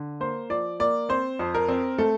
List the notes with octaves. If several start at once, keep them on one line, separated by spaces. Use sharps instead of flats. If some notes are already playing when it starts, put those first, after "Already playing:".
Already playing: D3
A#3 C5
F3 D5
A#3 D5
C4 C5
F2
A#4
C4
A3 A4